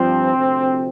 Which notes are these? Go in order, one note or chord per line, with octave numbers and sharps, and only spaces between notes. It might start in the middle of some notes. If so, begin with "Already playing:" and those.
Already playing: G2 F3 C4
D2 C3 F3